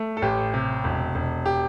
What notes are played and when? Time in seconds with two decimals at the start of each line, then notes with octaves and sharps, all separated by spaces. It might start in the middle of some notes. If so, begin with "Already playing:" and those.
Already playing: A3
0.17 A4
0.22 A1 G4
0.54 C3
0.84 E1
1.15 E1
1.46 G4